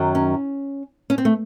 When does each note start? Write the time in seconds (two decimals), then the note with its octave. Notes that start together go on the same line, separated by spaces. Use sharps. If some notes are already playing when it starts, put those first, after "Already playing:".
Already playing: F#2 D#3 F#3
0.15 C#4
1.10 C#4
1.18 C4
1.25 A3